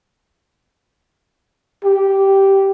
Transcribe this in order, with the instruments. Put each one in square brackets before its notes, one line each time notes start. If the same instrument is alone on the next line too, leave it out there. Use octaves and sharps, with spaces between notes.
[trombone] G4